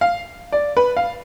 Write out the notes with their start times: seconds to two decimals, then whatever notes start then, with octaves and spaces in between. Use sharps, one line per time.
0.01 F5
0.52 D5
0.77 B4
0.97 F5